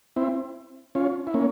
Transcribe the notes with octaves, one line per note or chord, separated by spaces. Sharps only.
C4 E4
C#4 F4
E4
A#3 C#4